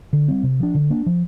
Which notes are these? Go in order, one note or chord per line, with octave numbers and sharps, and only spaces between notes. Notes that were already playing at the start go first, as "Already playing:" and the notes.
D3
G3 C4
C3
F3 D4
D3
A#3 D4
F3